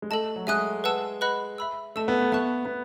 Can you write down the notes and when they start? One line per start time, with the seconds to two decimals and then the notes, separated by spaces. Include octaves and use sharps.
0.02 G#3
0.10 A3 A4 D#5 A5
0.36 F#3
0.47 G#3 E5 G#5 D#6 F#6
0.84 B4 F#5 A5 E6
1.21 B4 D#5 F#5 B5 F#6
1.58 E5 B5 E6
1.96 A3 D#5 A5 E6
2.08 B3
2.20 A3
2.32 B3 E5 A5 C#6 F#6
2.65 B3